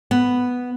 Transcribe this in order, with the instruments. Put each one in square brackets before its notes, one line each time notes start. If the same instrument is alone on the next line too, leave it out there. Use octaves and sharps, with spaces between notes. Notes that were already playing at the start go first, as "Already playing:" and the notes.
[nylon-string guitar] B3